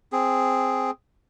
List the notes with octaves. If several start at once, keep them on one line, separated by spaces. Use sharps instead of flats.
C4 G#4